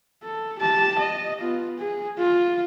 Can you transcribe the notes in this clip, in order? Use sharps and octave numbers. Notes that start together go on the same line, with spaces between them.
A4
G4 A5
D#5
B3 F4
G#4
F4